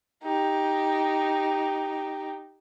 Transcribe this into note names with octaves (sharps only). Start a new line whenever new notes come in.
D#4 G4